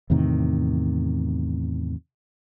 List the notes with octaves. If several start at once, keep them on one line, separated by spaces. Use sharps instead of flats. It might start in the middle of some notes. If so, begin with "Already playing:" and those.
E2 A2 C3 D#3